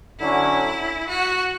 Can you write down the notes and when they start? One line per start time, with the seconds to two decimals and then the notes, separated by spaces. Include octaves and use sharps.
0.20 D3 F#3 C#4 E4
1.08 F#4